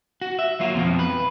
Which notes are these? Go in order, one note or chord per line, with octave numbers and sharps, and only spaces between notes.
F#4
E5
F#3 A#3 F4 F#4
F2 B2 D3 F3
B4